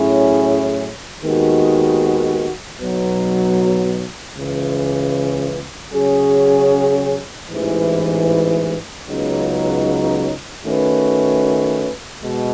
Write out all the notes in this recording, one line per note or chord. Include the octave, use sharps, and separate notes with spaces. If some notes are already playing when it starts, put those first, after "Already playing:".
Already playing: A2 F#3 C#4 E4 G#4
D#2 D#3 G#3 B3 F#4
B1 B2 F#3
C#2 C#3 E3
C#3 F#3 C#4 G#4
A1 G#2 E3
C#2 C#3 F#3 B3 D#4
D#3 A3 C#4 F#4 B4
B2 G#3